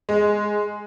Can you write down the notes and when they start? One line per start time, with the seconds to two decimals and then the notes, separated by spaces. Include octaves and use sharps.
0.09 G#3